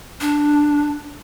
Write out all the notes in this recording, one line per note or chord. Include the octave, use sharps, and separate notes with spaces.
D4